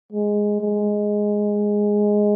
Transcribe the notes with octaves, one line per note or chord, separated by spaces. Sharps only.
G#3
G#3